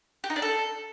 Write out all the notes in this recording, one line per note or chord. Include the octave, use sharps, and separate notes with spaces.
G4
D#4
D4
A4